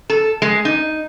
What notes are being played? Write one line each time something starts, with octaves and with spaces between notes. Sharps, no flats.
A4
G#3
D#4